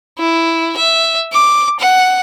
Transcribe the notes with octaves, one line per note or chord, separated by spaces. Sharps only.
E4
E5
D6
F#5